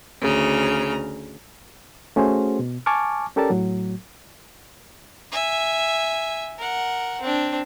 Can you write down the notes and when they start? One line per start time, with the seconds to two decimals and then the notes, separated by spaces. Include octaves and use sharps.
0.21 D2 C#3 A#5
2.16 A3 C#4 F#4 G#4 C5
2.59 B2
2.86 G#5 A5 C#6 D6 F6
3.36 C#4 G4 A4 A#4 D5 A5
3.50 A2 F#3
5.32 E5 G#5
6.58 A#4 F#5
7.21 C4 D4